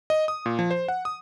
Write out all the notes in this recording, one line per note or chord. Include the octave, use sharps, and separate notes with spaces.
D#5
D#6
A#2
F3
C5
F#5
D#6